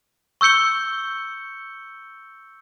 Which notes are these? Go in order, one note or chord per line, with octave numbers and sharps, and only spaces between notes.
C#6 E6 G6 C#7 G7